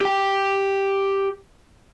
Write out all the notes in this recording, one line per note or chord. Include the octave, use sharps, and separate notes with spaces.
G4 G5